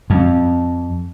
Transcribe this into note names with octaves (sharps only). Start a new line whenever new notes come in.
F2